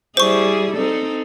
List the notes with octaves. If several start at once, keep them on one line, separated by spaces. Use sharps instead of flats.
G3 E4 G#4 C5 C#6
C4 D#4 A4